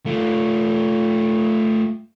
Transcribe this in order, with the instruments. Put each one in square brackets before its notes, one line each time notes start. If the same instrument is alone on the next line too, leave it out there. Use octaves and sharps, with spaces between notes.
[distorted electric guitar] A3 F4